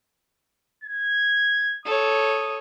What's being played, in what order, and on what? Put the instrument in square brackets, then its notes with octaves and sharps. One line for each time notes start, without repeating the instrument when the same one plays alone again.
[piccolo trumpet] G#6
[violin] A4 C#5 [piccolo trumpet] D#6